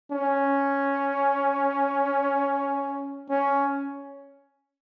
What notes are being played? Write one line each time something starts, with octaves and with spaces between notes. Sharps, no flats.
C#4
C#4